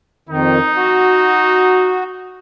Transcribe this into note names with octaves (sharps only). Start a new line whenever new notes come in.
F2 D#3 D#4
F#4